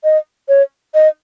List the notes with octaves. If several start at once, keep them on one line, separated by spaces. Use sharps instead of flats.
D#5
C#5
D#5